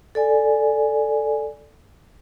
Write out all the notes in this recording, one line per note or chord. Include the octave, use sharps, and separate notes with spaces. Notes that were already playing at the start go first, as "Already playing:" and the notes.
A4 D5 G#5